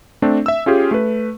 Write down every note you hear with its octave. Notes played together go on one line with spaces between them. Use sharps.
A3 C4 D4
E5 E6
C#4 F4 G4 G#4
A3 B4